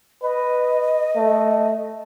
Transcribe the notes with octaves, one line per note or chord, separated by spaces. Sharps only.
B4 D#5
A3